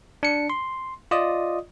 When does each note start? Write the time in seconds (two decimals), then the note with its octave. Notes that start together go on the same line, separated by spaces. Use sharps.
0.23 D4 C#7
0.50 C6
1.11 F4 D5 D#5 D#6